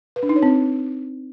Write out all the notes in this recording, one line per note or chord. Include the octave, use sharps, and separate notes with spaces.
B4
D4
D#4
C#5
C4